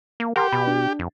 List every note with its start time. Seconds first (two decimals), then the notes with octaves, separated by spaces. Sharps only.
0.20 A#3
0.36 G4 A#4 F#5 C6
0.52 B2 B5
0.67 D4
0.99 F2